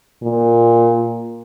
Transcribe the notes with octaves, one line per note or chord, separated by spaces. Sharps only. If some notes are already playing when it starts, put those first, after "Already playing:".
A#2